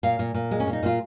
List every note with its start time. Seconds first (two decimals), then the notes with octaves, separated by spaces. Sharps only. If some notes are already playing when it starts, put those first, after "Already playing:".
0.03 A#2 F5
0.19 A#2
0.34 A#2
0.51 G#3
0.60 C#4
0.67 A#2
0.73 D#4
0.83 A#2 F4